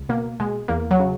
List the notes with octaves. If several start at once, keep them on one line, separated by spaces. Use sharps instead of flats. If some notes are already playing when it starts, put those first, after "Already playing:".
Already playing: C#2
B2 A#3
B2 G#3
E2 A#3
F#3
C#3